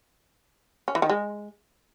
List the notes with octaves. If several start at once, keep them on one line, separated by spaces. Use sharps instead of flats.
C#4
E3
D#3
G#3